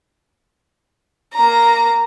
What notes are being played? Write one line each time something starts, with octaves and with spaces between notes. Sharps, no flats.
A#3 A#5